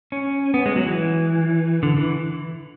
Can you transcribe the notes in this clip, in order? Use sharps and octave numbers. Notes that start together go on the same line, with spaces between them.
C#4
B3
G#3
F#3
E3
D3
E3